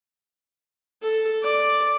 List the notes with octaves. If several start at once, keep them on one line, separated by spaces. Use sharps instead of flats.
A4
D5